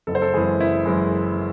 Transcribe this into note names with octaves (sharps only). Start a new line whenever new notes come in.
F#1 A4
C5
A4
F#2 E3 G#3 G#4
F#1 E4
F#2 E3 G#3